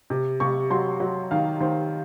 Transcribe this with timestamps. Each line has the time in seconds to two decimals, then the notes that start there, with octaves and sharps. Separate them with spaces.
0.10 C3
0.40 C3 C#6
0.70 F#3 C6
1.00 F#3
1.31 D#3 F5
1.60 D#3 C5